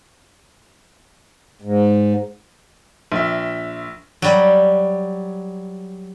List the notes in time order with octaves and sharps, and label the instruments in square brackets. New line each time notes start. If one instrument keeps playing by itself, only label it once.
[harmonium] G#2
[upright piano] A#1 E5
[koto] F#3 G3